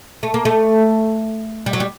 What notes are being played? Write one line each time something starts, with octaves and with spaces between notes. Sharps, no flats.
A3
A#3
A3
G3
F#3
G3